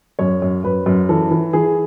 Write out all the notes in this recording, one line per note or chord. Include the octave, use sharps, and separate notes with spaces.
F#2 C#5
F#2
F#2 B4
F#2
E3 A4
E3
E3 G#4